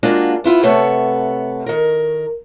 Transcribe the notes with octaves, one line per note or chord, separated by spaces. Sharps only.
G#3 A#3 D4 F4 F#4
B3 E4 F4
C3 A3 B3 C#5 A5
D#3 A#4